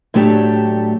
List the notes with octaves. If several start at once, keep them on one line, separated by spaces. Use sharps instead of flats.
A2 F#3 A3 D4 G4 A4